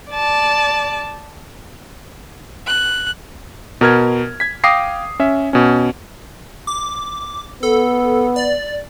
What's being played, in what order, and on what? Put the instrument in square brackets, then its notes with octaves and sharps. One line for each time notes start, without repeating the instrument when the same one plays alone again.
[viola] D5 A5
[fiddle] F#6
[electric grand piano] B2 A#4 F6 G#6
G#6 B6
F5 G5 D6 D#6 A#6 C7
C#4 E5
B2 C#4
[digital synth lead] D6
[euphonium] B3 [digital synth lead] A4
[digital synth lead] D5